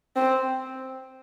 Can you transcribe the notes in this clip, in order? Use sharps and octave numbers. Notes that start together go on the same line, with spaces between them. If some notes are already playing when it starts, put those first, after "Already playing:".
C4